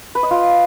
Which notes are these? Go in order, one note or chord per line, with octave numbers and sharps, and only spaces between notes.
B4
D#5
F4